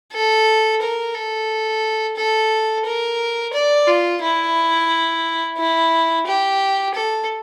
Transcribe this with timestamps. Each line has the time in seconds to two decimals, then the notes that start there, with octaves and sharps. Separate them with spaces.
0.13 A4
0.82 A#4
1.15 A4
2.17 A4
2.86 A#4
3.54 D5
3.87 F4
4.22 E4
5.58 E4
6.27 G4
6.94 A4